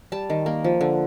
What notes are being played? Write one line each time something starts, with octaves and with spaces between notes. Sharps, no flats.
G3 A5
D#3
A#3
F3
D3